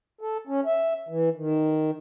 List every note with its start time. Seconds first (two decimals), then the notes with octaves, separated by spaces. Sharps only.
0.21 A4
0.47 C#4
0.66 E5
1.09 E3
1.36 D#3